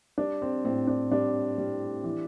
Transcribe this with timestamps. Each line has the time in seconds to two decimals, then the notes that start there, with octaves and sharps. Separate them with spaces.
0.18 G3 D4
0.42 C4
0.65 A2 C4
0.87 D4
1.11 G3 D4
1.58 G3
2.04 E3